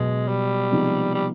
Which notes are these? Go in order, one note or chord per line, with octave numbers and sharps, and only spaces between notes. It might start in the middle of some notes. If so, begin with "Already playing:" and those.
Already playing: B2 F#3 G#3 B3
G3
C3 F3 G#3 B3 D#4
G3